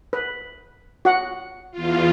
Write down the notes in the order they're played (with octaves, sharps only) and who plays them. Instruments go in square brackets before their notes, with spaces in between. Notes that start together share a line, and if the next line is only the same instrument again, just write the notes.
[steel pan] B4
F#4 F#5
[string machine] E2 F4